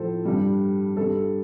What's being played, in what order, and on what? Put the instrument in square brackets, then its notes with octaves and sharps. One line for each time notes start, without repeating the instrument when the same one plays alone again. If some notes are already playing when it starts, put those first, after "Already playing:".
Already playing: [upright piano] A2 F3 A4 C5
G2 G3
G2 G3 A4